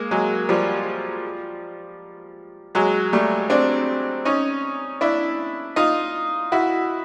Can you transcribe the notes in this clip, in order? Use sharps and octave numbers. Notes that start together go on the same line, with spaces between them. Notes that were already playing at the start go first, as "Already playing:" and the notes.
Already playing: G#3 A#3
F#3 G#3
F3 G3
F#3 G#3
G3 A3
C4 D4
C#4 D#4
D4 E4
D#4 F4
E4 F#4